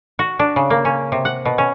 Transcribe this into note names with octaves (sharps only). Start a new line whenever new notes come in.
F#4
D4
C#3
A#3
C#4
C3
F#5
B2
C#4